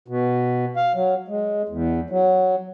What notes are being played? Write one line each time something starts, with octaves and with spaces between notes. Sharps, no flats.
B2
F5
F#3
G#3
E2
F#3